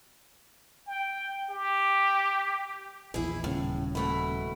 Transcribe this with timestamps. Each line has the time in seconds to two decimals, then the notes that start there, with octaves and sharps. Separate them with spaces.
0.87 G5
1.50 G4
3.14 A#1 E2 E4 G#4
3.44 D#1 A2 C#3
3.95 B2 A3 E4